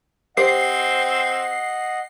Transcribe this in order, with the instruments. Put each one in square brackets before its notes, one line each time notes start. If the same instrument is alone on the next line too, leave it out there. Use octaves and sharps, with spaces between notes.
[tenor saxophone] C4 [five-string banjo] G4 C5 [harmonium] D#5 F#5 [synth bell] C7